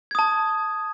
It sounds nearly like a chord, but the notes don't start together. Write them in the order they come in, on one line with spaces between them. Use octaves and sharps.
G#6 D#6 A5